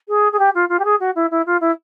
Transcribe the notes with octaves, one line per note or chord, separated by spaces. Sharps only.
G#4
G#4
G4
F4
F4
G4
G#4
F#4
E4
E4
F4
E4